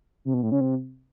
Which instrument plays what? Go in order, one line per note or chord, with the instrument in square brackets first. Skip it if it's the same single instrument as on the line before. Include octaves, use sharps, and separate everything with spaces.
[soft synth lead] C3
B2
A2
C#3
C3